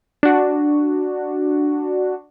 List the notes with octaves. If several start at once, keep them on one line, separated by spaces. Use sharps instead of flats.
D4 F#4